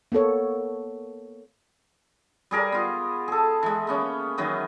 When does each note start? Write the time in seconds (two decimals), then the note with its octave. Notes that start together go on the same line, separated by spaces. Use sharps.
0.12 A#3 B3 A4 C#5
2.51 G3 G#4 A#4 D5
2.72 B3 F4
3.28 G#4 A4
3.63 E3 G#3
3.87 A#3 B3 C#4
4.38 D#3 E3 F#3 B3